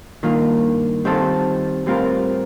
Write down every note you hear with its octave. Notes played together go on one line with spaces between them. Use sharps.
G2 D#3 A#3 F4
D#3 G3 C4 F4 A4
A2 G3 C4 F4 A#4